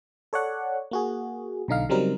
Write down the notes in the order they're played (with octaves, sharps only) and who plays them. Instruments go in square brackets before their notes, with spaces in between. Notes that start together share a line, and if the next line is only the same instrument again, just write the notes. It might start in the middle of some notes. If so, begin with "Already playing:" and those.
[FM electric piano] A4 C#5 D5 F#5
A#3 F#4 G#4
B1 D3 D#4 F5
C#3 F#3 G3 C4 D#4 A#4